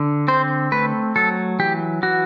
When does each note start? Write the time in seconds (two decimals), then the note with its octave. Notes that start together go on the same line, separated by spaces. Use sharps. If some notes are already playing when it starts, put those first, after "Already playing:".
Already playing: D3
0.28 C4 C5
0.72 A3 B4
1.16 F#3 A4
1.59 E3 G4
2.03 E3 F#4